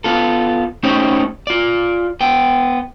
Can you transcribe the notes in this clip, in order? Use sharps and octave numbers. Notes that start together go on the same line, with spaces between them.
B3 F4 A4
A3 C#4 D#4 G4 C5 C#5
F4 D5
B3 G5